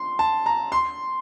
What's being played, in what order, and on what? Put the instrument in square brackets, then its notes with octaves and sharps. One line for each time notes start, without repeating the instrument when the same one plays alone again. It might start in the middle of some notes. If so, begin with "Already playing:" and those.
Already playing: [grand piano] C6
A5
A#5
C6